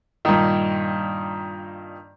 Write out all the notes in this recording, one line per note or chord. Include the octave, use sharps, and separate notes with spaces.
G2 A#2 D#3